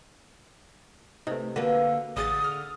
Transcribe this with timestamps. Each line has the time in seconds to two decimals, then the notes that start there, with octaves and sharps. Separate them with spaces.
1.27 C3 A3 D#4
1.56 D3 A#3 F#4 A4 B4
2.17 A1 D3 G#4 D#6 A6
2.44 F6